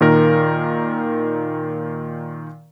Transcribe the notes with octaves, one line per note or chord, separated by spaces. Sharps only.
A#2 D#3 A#4